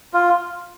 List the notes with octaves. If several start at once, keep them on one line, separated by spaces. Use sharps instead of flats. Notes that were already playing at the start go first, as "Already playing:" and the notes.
F4